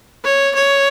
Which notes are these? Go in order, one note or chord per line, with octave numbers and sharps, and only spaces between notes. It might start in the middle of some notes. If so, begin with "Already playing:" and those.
C#5
C#5